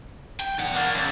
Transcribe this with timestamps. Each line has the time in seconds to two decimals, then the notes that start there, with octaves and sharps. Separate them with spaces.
0.40 G5
0.59 E2 F#5
0.75 A#3 D4
0.95 C#2